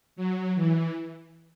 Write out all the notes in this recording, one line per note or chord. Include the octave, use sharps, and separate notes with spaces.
F#3
E3